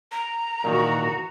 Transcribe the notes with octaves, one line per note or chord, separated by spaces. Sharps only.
A#5
A#2 D#3 E3 F#4